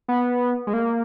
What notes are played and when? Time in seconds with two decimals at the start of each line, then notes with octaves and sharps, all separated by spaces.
0.08 B3
0.67 G#3
0.73 A#3